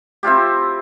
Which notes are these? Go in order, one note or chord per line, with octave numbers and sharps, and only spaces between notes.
C4 E4 F4 G4